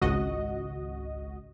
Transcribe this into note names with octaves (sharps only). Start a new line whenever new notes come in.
G#1 C#2 F#4 D#5